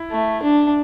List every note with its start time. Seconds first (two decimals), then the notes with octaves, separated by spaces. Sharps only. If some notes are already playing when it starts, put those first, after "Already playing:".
Already playing: E4
0.11 A3
0.42 D4